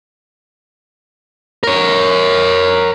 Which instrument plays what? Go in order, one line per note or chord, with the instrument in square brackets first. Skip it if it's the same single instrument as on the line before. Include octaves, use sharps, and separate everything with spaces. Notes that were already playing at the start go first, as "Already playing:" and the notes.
[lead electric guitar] A#4 C#5